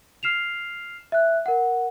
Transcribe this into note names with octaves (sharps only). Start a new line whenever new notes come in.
F6 C7 E7 F7
E5 F#6
A#4 F#5